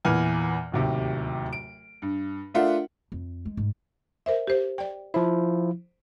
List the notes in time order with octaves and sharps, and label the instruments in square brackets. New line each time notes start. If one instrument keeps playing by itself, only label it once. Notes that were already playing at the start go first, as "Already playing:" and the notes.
[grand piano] E2 A#2 E4 B4 G#5 F6
D1 D#2 C3 G4
D7
G2
A3 D4 F4 A#4 E5 F#5
[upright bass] F2
G#3
G#2
[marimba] A#4 C5 E5
G4 C5
D5 G5
[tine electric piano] F3 E4 [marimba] C5